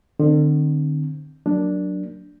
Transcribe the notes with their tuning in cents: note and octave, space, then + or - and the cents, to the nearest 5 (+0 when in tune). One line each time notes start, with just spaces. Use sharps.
D3 +45 C4 +0
F#3 +0 A#3 -5 D4 +0